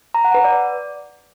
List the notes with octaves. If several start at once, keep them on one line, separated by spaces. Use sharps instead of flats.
A#5
F#5
B4
D5